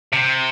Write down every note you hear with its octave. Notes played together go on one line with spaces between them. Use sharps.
C3